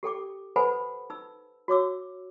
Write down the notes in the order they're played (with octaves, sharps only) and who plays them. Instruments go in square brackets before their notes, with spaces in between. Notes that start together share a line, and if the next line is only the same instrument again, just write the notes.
[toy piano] G4 A4 G5 D6
A4 B4 C5 F#5 G#5 B5
D#4 E6
F#4 C#5 D6 E6